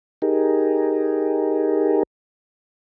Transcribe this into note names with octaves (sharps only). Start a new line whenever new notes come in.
D#4 G4 G#4 A#4